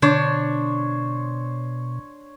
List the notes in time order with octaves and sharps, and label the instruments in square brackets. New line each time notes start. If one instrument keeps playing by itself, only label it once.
[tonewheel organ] B2 [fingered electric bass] D3 [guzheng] D4 [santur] C5 C#5